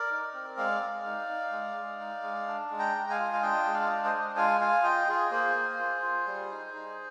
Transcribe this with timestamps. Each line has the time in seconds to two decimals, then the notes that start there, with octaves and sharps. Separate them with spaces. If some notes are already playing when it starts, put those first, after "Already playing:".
Already playing: A#4 D5
0.11 D#4
0.33 C4
0.57 G#3 D5 F5
0.81 G#3
1.05 D#4
1.28 D#4
1.52 G#3
1.76 G#3
2.00 D#4
2.23 G#3
2.48 D4
2.71 G#3
2.79 G5 A#5
2.95 G#3
3.10 F5 G#5
3.19 F4
3.33 F5
3.42 D4 D#5 G5
3.64 G#3 D#5
3.74 D5 F5
3.90 D4
4.04 C5 D#5
4.13 G#3
4.36 F4 F5 G#5
4.61 F4 F5 G#5
4.83 F4 D#5 G5
5.07 F4 G#4
5.31 A#3 G#4 C5
5.56 A#3
5.79 F4
6.02 F4
6.26 G3
6.51 D#4
6.74 D#4